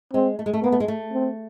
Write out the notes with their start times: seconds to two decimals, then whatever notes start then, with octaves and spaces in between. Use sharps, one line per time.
0.14 G#3 C4
0.39 A3
0.46 G#3
0.53 A3
0.63 A#3 B3
0.72 A3
0.80 G#3
0.88 A3
1.13 C4